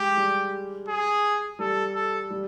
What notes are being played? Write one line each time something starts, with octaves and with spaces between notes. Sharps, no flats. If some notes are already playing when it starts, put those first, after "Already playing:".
Already playing: G#3 G4
G3
G#4
G3 A4
A4
G3